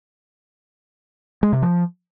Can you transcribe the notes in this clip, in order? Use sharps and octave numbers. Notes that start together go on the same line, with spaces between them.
G#3
C3
F3